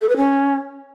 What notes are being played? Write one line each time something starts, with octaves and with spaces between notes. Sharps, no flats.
A4
B4
C#4